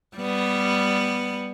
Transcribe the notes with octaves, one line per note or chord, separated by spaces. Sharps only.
G3 B3